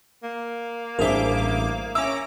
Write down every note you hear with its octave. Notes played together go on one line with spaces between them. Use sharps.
A#3
A1 G2 G#4 A#4 C5 E5 D6
C#4 E5 A#5 D6 E6